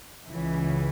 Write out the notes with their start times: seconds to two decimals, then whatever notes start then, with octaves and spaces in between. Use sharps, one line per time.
0.28 C#2 C#3 E3